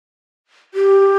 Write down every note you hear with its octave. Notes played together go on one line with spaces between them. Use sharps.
G4